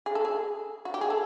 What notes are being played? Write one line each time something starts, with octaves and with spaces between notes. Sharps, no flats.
G#4
A4
G#4
F#4
G4
G#4
A4